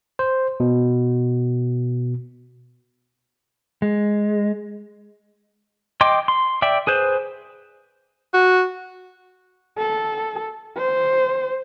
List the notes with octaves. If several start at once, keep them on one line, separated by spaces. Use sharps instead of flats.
C5
B2
G#3
D#5 G5 C6 D6
C6
D5 E5 G5
G#4 B4 C5
F#4
A4
C5